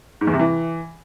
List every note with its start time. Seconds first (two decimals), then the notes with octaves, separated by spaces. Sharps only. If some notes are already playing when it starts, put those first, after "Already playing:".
0.21 G#2
0.27 E2
0.33 C3
0.40 E3